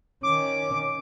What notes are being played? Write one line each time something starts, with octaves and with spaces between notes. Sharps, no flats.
D#3 C#4 D6